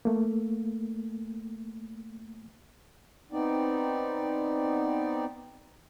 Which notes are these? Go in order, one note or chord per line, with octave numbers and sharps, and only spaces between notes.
A3 A#3
B3 C4 D#4 D5